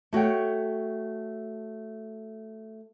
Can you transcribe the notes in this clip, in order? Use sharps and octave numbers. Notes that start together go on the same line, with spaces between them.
A3 F#4 C#5 G5